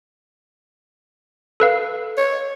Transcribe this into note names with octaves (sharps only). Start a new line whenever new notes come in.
A4 B4 F5
C#5